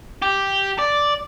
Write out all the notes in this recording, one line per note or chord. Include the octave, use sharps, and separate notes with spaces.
G4
D5